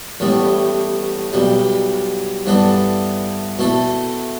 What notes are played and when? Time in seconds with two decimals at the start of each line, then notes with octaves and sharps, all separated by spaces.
0.20 A1 A2 G3 B3
1.33 B1 B2 G3
2.46 G2 E3 B3 D4 A4
3.59 B2 A3 E4 A4